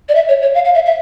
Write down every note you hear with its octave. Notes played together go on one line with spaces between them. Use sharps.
D5
E5
C#5
C#5
F5
F5
E5
E5